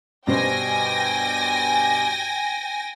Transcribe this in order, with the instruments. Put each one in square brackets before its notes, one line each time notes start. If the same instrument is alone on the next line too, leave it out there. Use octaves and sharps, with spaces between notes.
[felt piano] G2 B2 C5 [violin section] G5 G#5 A#6